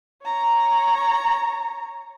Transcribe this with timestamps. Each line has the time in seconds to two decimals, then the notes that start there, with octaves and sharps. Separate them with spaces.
0.24 C#5 A#5